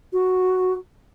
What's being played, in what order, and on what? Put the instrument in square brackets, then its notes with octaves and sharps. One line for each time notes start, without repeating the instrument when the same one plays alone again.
[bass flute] F#4